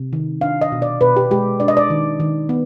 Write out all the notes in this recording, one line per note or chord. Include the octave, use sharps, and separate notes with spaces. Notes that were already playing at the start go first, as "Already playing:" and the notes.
Already playing: C3
D#3
D4 F5
D#5
B2
D5
B2 B4
G4
G#3 G4
D4 D5
D#5
D5
D#3
D#3
B3